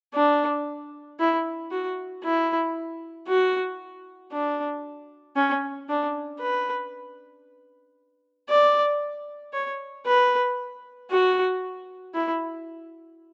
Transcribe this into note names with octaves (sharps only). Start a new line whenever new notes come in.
D4
E4
F#4
E4
F#4
D4
C#4
D4
B4
D5
C#5
B4
F#4
E4